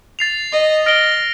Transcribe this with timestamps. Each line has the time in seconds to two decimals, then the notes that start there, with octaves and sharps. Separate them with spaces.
0.19 A6 C7 F7
0.53 D#5
0.86 F6 A#6 D7 G7